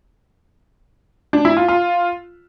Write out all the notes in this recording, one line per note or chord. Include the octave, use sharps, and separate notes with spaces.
D4
E4
F4
F4